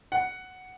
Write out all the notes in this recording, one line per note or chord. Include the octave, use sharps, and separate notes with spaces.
F#5